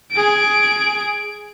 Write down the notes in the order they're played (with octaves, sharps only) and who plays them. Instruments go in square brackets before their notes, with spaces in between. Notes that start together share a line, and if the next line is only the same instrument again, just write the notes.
[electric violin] G#4 D7